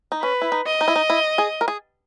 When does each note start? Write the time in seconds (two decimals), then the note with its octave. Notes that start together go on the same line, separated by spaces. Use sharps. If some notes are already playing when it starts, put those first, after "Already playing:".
0.12 D#4
0.22 C#4 B4
0.42 E4
0.52 D#4
0.66 D#5
0.81 D#4
0.88 E4
0.96 D#4
1.10 E4
1.38 G#4
1.61 A#4
1.68 G#4